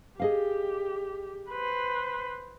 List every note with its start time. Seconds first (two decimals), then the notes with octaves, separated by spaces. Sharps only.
0.19 G4 G#4 D#5 F5
1.50 B4 C5